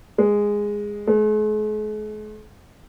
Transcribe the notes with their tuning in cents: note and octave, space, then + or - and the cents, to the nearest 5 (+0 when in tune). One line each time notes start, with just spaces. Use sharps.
G#3 -10
G#3 +45